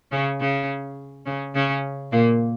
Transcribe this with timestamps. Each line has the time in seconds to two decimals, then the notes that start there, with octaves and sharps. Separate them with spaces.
0.12 C#3 C#4
0.41 C#3 C#4
1.26 C#3 C#4
1.55 C#3 C#4
2.12 A#2 A#3